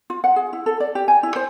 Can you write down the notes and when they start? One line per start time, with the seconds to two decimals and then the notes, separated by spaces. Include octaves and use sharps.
0.10 F4
0.24 F#5
0.36 G#4
0.53 E4
0.66 A4
0.80 D5
0.95 G4
1.08 G#5
1.23 E4
1.36 C5